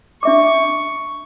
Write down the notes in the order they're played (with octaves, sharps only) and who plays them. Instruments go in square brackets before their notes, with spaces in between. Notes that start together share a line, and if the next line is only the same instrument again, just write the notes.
[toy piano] D4 E5 D6 [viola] C#6